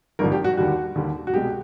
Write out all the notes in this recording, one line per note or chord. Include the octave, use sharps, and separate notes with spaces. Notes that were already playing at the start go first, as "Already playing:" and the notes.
G#1 G2 D3 F3 A#4
G4
F#4
D#2 D3 G3 F#4
D#2 D3 G3
F#4
C2 B2 G#3 G4